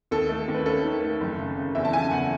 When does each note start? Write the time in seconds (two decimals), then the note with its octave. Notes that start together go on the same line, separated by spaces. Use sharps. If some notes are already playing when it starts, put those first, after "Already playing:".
0.11 D#2 A4
0.29 A3
0.48 D#2
0.54 B4
0.66 C#4 A4
0.83 D#3
1.02 A3
1.21 F#1
1.38 C#3
1.57 C#3
1.75 E2 E5
1.85 A5
1.93 C#3 G#5
2.11 E2 F#5